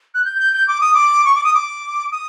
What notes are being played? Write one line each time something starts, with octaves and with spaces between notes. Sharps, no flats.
F#6
G6
G6
G6
D6
D#6
D6
C#6
D6
D#6
D6
D#6